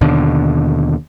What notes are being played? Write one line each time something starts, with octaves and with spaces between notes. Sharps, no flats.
D#2 B2 D3